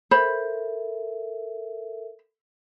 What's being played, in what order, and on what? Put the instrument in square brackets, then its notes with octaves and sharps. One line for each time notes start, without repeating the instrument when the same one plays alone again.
[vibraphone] A4 A#4 E5 [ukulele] C5 B5